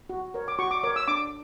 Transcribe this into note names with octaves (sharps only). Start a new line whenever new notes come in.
F#4
A#4 C#5
D6
F#4 C#6
D6
A#4 C#5 D6
E6
D4 D6